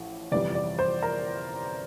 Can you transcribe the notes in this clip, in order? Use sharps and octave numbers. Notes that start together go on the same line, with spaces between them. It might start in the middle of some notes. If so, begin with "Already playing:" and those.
Already playing: A1 A2 F3
G1 F2 C3 E3 G3 D5
D5
C5
A#4